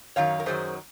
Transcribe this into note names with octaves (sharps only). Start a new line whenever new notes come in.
F#2 D#3 F#3 C#5 F5
A#4
F#2 D#3 F#3 G#4 C5